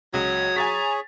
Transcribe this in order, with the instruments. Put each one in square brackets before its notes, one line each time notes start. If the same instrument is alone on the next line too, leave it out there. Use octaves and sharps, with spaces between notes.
[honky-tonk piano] C#2 [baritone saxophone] F#3 [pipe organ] C#5 D#6 G#6
[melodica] G#4 C#5 [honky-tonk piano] G#5 A6 B6 [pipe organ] A#5